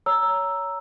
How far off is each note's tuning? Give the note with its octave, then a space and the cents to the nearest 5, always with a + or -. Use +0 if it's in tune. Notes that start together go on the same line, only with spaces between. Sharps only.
C#5 +15 A#5 +0 E6 +0